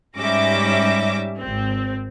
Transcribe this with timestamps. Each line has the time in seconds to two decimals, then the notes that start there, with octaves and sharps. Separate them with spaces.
0.19 G#2 G3 C#4 E5 D6 A#6
1.39 G#1 C4